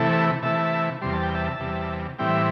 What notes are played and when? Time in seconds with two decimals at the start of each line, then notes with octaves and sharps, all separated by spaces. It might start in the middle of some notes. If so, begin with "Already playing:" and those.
Already playing: C3 E3 A3 E4 A4
0.42 C3 E3 A3 E4 E5 A5
1.02 E2 C3 G3 C6
1.13 A5
1.23 G5
1.34 E5 A5
1.60 E2 C3 G3
2.19 A2 E3 G3 C4 E4 G5
2.31 E5